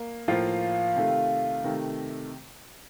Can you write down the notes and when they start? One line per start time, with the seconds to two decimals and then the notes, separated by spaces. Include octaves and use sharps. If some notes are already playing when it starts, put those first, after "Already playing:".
Already playing: A#3
0.28 A2 F3 A#3 F4
0.96 C3 D#3 A3
1.64 C3 D#3 A3